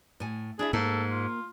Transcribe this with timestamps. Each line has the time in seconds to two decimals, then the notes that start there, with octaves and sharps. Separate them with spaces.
0.20 A2 G#5
0.59 D4 E4 G#4 E5
0.73 G#2 A#3 A4
1.11 F4